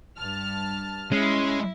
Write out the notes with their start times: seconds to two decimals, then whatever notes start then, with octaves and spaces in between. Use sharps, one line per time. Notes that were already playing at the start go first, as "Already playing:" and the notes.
0.18 G2 A5 F6
1.12 G#3 C#4 E4